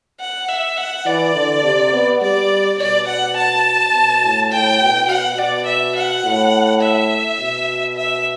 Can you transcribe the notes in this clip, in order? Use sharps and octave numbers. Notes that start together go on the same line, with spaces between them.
F#5
E5
F#5
E3 D5
D3
C3
B3
G3 D5
B2 D5
F#5
A5
B2
A2
A2 G5
B2
B2 F#5
B2 D5
E5
F#5
A2
E5
B2
E5